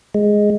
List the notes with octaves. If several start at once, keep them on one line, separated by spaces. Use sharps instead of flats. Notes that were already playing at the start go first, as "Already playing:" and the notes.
G#3